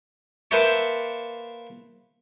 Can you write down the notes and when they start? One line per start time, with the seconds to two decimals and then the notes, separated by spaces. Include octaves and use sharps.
0.51 A#3 B4 C5 E5 A5 C#6